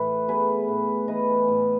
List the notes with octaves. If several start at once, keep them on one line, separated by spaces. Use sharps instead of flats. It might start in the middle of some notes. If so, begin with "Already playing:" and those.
Already playing: A2 E3 B4
B3 G#4 B4
A2
E3 B4 D#5
A2